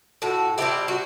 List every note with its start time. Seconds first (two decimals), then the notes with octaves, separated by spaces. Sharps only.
0.22 A2 F#4
0.58 G3 C4 E4 G4
0.88 F#4